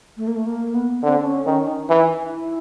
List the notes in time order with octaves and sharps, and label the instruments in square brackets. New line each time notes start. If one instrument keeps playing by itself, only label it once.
[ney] A3
A#3
A3
A#3
B3
[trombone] D3 [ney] C4
[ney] D4
C#4
[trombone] D#3 [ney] C#4
[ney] D#4
[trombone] E3
[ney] D#4
E4